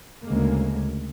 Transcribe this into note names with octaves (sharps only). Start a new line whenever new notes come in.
D2 C#3 G#3 A#3